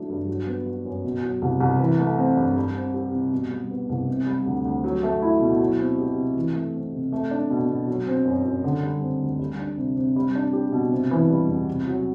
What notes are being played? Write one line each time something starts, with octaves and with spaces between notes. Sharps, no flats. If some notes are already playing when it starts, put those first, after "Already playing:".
Already playing: F#3 A3 D4
G2
F#3
B3
F#4
F#2
B2
F#3
C2
C2
E3
A3
C4
G2
G3
C4
G4
C3
B2
G3
B3
C2
C3
G3
D2
D2
F#3
A3
E4
B2
F#3
C4
G4
C3
E3
A3
C4
C3
A3
D4
B2
B2
F#3
C4
F#2
F#2
D3
G3
C4
D2
G3
D4
C3
C3
G3
D4
G4
B2
C3
E3
G3
E2
C3
F#3